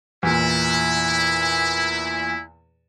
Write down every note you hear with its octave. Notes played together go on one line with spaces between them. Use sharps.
E2 A#2 E4